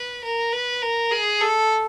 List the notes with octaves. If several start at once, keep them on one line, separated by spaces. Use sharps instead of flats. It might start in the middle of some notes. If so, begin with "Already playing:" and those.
Already playing: B4
A#4
B4
A#4
G#4
A4